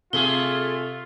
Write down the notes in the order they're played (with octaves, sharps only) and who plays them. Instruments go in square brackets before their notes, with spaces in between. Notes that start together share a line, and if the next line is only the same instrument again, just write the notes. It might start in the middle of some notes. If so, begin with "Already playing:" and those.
[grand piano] C3 [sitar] A3 G#4 [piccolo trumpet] F4 [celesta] G7